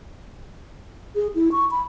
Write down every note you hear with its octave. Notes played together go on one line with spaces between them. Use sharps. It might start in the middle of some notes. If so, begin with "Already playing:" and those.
G#4
E4
C#6
B5